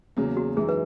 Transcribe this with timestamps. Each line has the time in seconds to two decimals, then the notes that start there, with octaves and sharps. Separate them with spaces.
0.17 E2 C#3 F#3 A#3
0.37 F#4
0.56 F#2 E3 G#3 D#4 G#4
0.69 B4